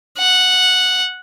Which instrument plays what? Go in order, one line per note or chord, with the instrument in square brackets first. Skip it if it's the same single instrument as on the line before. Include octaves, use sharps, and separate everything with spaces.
[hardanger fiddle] F#5